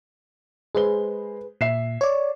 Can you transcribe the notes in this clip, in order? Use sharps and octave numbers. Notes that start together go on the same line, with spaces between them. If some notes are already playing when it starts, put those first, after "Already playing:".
G#3 G#4 B4 C5 G7
A#2 E5 C7 E7
C#5 D5